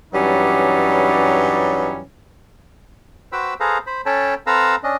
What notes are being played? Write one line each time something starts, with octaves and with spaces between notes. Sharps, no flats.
G2 E3 F#3 G3 C#4 D#4
F#4 B4 C5 G5 B5 E6
G#4 A4 B4 C5 F5 A#5
C5 B5
C#4 A4 C#5 G5 A5 B5
C4 A4 B4 F5 A#5 E6
C#4 D4 D#5